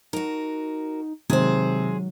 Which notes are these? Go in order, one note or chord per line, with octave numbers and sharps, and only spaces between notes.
D#4 F#4 A#4
C3 D#3 F#3 G#3 G#4 C5